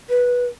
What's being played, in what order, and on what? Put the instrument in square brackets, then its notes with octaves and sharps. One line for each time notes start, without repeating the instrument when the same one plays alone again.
[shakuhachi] B4